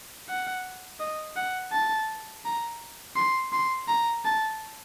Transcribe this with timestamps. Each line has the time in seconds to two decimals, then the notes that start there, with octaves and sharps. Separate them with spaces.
0.29 F#5
1.00 D#5
1.36 F#5
1.72 A5
2.45 A#5
3.16 C6
3.52 C6
3.88 A#5
4.25 A5